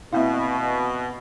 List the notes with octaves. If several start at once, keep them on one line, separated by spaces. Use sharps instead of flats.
B2 A#3 C4 E4 E5 F5